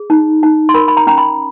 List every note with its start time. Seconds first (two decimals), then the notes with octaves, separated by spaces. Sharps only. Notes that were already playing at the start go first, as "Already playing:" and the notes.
Already playing: G#4
0.10 D#4
0.43 D#4
0.69 C6
0.74 A#4 B5
0.88 B5
0.97 A#5
1.07 C#4 A#5
1.18 B5